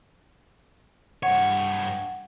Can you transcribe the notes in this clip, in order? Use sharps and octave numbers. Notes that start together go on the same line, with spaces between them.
G2 C#5 F#5